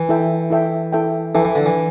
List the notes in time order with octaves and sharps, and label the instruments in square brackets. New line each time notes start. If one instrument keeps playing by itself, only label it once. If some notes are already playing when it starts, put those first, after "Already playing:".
Already playing: [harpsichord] E3
[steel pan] E4 A4 E5 G5
E4 A4 E5 G5
E4 A4 E5 G5
[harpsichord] E3 [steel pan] E4 A4 E5 G5
[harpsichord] E3
D3
E3